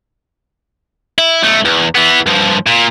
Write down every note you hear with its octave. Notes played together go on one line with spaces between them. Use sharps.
E4
B1 A3
E2
E3 B3
G2 F3
A#2